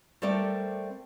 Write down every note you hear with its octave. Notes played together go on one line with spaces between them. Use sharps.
G3 A3 C4 A4 A#4 D5